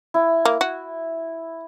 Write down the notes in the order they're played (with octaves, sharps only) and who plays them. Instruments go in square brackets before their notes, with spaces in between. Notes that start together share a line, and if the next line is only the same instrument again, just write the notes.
[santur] E4
[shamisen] A#3
F#4